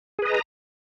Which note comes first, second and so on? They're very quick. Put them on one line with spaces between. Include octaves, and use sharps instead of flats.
G#4 B4 D#5 A#5